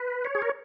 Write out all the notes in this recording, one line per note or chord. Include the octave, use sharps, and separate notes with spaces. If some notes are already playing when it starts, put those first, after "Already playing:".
Already playing: B4
C#5
G#4
A#4